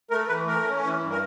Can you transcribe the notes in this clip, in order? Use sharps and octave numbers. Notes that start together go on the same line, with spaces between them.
A3 A#4
E3 B4
A3 A#4
C#4
E3
G2
A#4